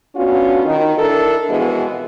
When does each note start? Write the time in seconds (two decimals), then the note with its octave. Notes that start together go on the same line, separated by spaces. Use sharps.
0.15 B3 C#4 D4 F4 F#4
0.65 D#3
0.98 D4 E4 A4 A#4
1.50 F2 B2 E3 G#3 B3 G#4